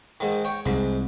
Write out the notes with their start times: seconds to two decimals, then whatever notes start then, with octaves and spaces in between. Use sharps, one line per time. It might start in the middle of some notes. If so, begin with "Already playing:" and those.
0.20 G#2 D#3
0.45 C#5 G5
0.66 C2 G#2